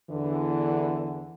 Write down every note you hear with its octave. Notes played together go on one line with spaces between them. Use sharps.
E2 D3 E3